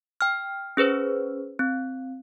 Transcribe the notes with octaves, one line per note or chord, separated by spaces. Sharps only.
G5 F6
C#4 G#4 B4 C5
C4